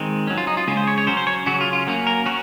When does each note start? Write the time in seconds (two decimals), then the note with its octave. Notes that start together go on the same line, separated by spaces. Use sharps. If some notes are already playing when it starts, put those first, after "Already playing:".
Already playing: D#3 G#3 C4
0.27 F#3 C#4
0.38 F4
0.47 D#4
0.57 F4
0.68 C#3 G#3 C#4 F4
0.77 C5
0.88 C#5
0.98 C#5
1.07 F#3 C#4 C5
1.17 C5
1.27 C#5
1.46 C#3 F#3 C#4 F#4
1.61 F4
1.73 F4
1.87 F#3 A#3 C#4
2.07 A#4
2.26 C#4 F#4